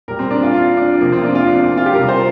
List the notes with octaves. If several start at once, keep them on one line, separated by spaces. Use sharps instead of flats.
A#2 G3 A#4
C4
D4
F4
F4
D4
C3 F3 A#3
C4
F4
D4
F4
D4
C4
F4
G4
C3 G3 A#4
C5